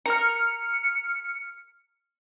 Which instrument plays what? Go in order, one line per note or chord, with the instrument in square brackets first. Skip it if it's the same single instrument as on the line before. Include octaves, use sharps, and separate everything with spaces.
[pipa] A#4 [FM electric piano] F6 C#7